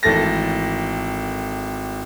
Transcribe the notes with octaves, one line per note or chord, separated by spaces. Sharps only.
G#1 E3 A3 A4 A6 A#6